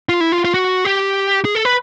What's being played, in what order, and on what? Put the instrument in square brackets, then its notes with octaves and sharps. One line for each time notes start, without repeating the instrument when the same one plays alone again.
[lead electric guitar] F4
E4
F4
F4
F#4
G4
G#4
A4
B4